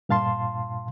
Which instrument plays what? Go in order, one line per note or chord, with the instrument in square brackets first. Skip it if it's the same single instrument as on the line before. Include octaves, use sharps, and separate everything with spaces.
[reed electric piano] G2 A#2 F5 A5 C6